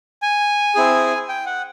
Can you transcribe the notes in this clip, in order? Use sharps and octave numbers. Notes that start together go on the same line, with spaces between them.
G#5
C4 E4 G#4
G5
F#5